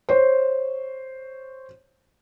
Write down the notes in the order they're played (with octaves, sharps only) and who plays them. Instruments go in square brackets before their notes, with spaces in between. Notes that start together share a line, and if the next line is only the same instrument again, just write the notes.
[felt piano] C5 C#5